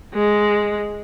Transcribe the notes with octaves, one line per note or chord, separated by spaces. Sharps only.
G#3